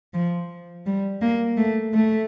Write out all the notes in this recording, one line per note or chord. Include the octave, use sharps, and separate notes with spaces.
F3
G3
A#3
A3
A3